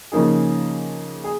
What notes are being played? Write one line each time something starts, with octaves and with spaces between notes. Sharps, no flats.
C#3 F3 A#3 D#4 G#4
G#4